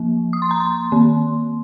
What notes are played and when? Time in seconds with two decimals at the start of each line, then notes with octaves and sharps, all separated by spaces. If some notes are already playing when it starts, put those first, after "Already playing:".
Already playing: F3 A#3
0.33 D#6
0.42 C6
0.51 A#5
0.60 C6
0.92 D#3 A#3